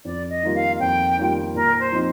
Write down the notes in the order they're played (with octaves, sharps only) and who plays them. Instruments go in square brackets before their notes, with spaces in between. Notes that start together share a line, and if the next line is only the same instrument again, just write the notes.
[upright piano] F2 [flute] D5
[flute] D#5
[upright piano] D#3 G3 A#3 F4
[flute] F5
[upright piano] F2 [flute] G5
[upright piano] D#3 G3 A#3 F4
[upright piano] A#2 [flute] A#4
[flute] C5
[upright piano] F3 C4 D#4